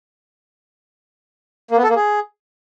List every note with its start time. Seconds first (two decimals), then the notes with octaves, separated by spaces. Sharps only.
1.71 A#3
1.77 B3
1.83 A4
1.90 A#3
1.96 G#4